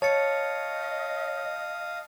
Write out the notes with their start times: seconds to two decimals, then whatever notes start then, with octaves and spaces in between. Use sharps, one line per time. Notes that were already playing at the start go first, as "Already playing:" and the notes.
0.02 C#5 D#5 F5 A5 D#6 A6 C#7